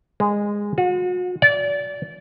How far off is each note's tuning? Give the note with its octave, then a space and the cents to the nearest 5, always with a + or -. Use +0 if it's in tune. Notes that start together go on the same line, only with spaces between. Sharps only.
G#3 -15
F#4 -40
D5 -25